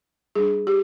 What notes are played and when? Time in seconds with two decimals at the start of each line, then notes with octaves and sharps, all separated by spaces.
0.35 G3 D4 G#4
0.67 G4